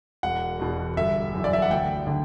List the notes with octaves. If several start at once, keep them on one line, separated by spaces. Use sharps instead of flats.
E1 F#5
E2 B2
G1 E5
F#2 E3
D5
E5
F#5
D2 G5
D3